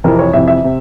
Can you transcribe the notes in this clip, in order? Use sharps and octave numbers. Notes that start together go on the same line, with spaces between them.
F2 C3 E3 A#4
C#5
F2 C3 E3 E5
E5
C3